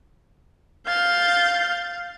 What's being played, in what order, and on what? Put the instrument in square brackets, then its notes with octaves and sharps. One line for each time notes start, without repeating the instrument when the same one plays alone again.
[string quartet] F5 G6 A6